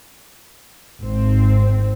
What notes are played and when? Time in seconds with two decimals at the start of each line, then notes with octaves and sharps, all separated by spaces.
1.02 G#1 C4